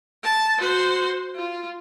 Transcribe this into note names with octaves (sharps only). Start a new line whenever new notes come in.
A5
F#4 C5
F4